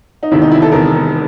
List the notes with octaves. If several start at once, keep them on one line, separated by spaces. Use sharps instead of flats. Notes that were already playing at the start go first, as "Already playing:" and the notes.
D#4
E1 E2 C3 D#3 E4
D#4
E4
A4
E1 E2 C3 D#3 A#4